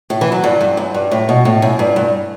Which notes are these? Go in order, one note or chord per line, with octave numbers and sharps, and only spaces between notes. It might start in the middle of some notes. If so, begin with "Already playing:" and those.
A2
E3
F#3
G2
G2
F#2
G2
A2
B2
A2
F#2
G2
G2